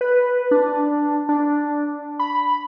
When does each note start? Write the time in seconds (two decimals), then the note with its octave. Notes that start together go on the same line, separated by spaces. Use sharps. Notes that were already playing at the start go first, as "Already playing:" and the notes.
0.01 B4
0.51 D4
1.29 D4
2.19 B5